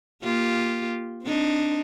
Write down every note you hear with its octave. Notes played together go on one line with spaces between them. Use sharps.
A#3 F4 G4
C4 D4 D#4